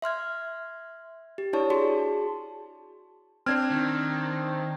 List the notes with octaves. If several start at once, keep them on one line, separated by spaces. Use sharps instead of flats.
E5 C6 F6 G#6
G4
D4 E4 C#5 D5 A5 C#6
F#4 G#4 A5 C6
C4 D4 C5 F6 G#6
D#3